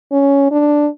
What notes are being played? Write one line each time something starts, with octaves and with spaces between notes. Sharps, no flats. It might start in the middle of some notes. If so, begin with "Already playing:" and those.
C#4
D4